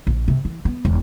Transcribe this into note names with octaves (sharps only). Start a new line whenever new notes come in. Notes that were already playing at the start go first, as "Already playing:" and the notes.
A#1
C3
E3
B3
E1